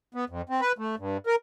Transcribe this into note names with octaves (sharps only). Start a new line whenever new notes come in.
B3
F2
C4
B4
A3
G2
A#4